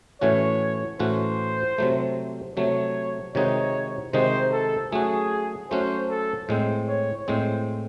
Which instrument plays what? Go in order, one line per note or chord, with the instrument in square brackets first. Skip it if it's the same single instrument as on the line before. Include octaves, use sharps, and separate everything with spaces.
[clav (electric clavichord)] A2 E3 A3 C#4 F#4 [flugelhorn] C#5
[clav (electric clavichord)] A2 E3 A3 C#4 F#4 [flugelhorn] C5
[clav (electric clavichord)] C3 F#3 A3
[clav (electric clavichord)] C3 F#3 A3 [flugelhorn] C#5
[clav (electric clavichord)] C3 D#3 G#3 D#4 F#4 [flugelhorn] C#5
[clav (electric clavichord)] C3 D#3 G#3 D#4 F#4 [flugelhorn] C5
[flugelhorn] A4
[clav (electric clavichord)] F#3 A3 C#4 F#4 [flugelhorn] G#4
[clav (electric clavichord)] F#3 A3 C#4 F#4 [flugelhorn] C5
[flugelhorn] A4
[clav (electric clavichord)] A2 G#3 C4 [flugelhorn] C5
[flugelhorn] C#5
[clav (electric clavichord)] A2 G#3 C4 [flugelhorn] C5